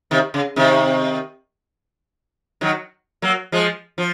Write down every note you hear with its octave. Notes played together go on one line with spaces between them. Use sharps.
C3 D#3
C#3
C3 D#3
D#3 F#3
F#3 A#3
F3 G#3
F3